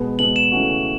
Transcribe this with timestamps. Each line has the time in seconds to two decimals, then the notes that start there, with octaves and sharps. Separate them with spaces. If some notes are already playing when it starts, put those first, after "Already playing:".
Already playing: B2 G#3 B3
0.19 B2 G#3 B3 F#7
0.36 E7
0.52 C#3 E3 A3 C#4 F#4